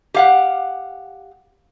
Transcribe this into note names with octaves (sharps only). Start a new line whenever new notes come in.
G4 F5 F#5